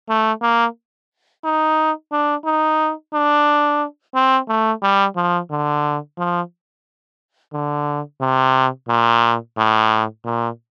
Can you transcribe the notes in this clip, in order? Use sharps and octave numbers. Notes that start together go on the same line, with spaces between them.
A3
A#3
D#4
D4
D#4
D4
C4
A3
G3
F3
D3
F3
D3
C3
A#2
A2
A#2